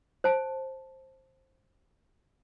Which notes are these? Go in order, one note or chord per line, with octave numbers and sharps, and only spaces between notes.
C5 A5